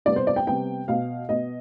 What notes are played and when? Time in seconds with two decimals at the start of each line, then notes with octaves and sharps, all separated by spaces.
0.05 C3 G3 B3 D5
0.16 C5
0.27 D5
0.36 G5
0.47 C3 G3 B3 G5
0.88 B2 B3 F5
1.29 B2 B3 D#5